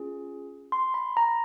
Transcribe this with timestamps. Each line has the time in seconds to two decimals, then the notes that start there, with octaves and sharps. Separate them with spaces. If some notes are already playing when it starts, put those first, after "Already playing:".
Already playing: C#4 F4 G#4
0.72 C6
0.94 B5
1.17 A#5